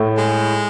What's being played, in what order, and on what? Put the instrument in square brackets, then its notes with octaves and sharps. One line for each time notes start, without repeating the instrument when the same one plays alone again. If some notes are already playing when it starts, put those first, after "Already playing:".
Already playing: [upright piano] A2
[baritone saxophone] G#3